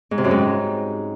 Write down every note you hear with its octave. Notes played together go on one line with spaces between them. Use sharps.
G#2
C3
F#2
G#2